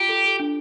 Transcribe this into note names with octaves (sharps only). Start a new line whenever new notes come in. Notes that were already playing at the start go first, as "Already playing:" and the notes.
Already playing: F4 G4
A4
A4
D4